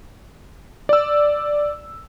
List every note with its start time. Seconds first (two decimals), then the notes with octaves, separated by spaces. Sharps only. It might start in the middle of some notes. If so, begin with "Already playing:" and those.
0.89 D5 E6